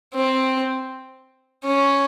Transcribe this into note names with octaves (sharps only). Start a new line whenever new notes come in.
C4
C#4